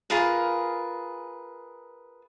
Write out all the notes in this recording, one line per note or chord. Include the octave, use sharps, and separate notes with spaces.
F4 G#4 A#4 B4